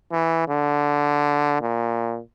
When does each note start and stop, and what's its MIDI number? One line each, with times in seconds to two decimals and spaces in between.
0.11 0.45 52
0.48 1.57 50
1.61 2.21 46